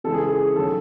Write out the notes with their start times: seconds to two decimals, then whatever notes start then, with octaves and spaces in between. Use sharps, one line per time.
0.04 C#3 E3 G#3 A4
0.14 G#4
0.32 G#4
0.56 D#3 F#3 A3 C#4 A4